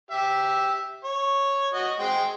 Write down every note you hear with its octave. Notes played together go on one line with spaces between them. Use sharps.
G4 E5
C#5
F#4 D#5
G#3 C5 G5